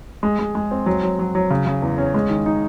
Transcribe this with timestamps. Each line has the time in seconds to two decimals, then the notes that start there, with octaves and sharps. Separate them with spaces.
0.23 G#3
0.39 G#3
0.55 G#3
0.71 C4
0.86 F#3
1.03 F#3
1.19 F#3
1.35 F#3
1.50 C#3
1.67 C#3
1.82 E2
1.98 C#4
2.14 G#3
2.30 D#3
2.46 D#4